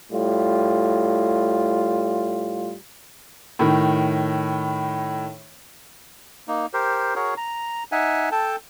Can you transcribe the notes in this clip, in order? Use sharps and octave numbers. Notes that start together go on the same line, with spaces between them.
A2 G3 F4
A2 D#3
A#3 D#4
G4 A#4 C5
F#4 G#4 A#4 C#5
A#5
D#4 E5 F#5 G#5
A4 G5 A5